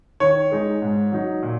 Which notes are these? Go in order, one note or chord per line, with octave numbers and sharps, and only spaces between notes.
D#3 C#5
G#3 D#4
G#2
F#3 D#4
A#2